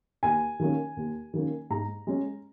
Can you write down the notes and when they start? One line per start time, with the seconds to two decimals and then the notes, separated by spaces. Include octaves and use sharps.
0.23 D#2 G#5
0.60 D#3 A#3 C#4
0.97 D#2
1.34 D#3 A#3 C#4
1.70 G#2 A#5
2.07 G#3 C#4